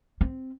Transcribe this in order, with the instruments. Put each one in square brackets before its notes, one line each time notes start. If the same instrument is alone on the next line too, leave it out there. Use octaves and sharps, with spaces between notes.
[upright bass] C4